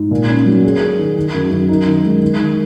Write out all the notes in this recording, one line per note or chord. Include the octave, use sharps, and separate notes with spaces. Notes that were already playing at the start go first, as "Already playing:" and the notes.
Already playing: G#2
A#2
C#4
F#3
G#4
G#4
D#3
D#3
F#2
F#2
D#4
D#3
G#3
D#3
D#3